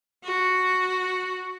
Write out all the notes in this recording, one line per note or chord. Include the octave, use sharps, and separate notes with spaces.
F#4